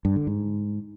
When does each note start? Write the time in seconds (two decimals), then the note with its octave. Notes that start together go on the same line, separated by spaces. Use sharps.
0.05 G2
0.16 D3
0.27 G#2